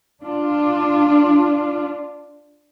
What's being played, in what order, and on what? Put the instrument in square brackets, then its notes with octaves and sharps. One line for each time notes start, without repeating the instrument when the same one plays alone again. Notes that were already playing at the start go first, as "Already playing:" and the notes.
[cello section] D4 F4